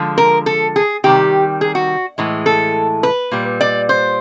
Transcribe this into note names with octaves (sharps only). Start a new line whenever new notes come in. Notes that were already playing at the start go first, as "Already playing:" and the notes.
Already playing: D3 F3 G#3
A#4
A4
G#4
C3 D#3 G3 G4
G#4
F#4
A2 E3 G#3
A4
B4
A#2 G3
D5
C5